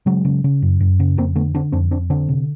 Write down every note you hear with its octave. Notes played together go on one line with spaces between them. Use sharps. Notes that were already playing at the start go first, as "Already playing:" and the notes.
C#3 F#3 G#3
C#3
C#3
F#2
F#2
C#3
F2 A#3 C4
D3 A3 B3
D3 C4 D4
F2 C4 D4
F2 C4 D4
D3 C4 D4
C3